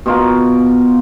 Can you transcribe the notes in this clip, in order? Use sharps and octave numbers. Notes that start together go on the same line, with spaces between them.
B2 F4 A#4